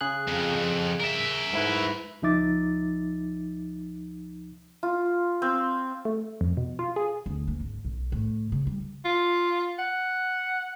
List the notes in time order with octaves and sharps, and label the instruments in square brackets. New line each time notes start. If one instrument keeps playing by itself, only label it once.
[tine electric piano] C#3 G#4 F#6
[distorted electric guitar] F2
F2
A#4 E5
[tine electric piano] G#2 E4 B4
[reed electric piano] C#2 F3 D#4 E5 D6 A6
[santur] F4
C4
[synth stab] A3
F2
B2
F4
G#4
[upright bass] D2
A#3
G#1
B1
A2
C#3
G3
[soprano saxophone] F4
F#5